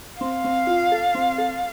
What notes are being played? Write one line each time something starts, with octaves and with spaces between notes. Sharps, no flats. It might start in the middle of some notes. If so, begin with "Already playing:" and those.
C4 F5
C4
F4
A4
C4
A4